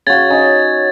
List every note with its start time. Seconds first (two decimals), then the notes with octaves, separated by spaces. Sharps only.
0.07 C#3 F#4 G#6 A6
0.30 C#4 D#4